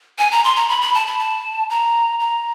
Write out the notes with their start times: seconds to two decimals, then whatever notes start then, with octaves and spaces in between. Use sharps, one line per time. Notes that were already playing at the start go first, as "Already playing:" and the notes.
0.18 G#5
0.31 A#5
0.44 C6
0.56 A#5
0.69 B5
0.82 B5
0.94 A5
1.07 B5
1.19 A5
1.70 A#5
2.20 A#5